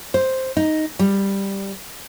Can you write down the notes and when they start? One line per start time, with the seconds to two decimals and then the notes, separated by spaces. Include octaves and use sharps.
0.14 C5
0.57 D#4
0.99 G3